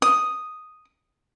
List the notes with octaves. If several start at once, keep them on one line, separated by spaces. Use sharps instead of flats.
D#6